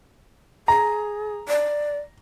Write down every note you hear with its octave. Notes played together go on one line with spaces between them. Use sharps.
G#4 A#5
D5